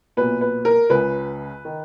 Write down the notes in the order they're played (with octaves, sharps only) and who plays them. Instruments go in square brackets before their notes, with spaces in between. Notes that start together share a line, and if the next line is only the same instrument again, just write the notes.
[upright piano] B1 A#2 B4
B4
A#4
C#2 C#3 B4
D#3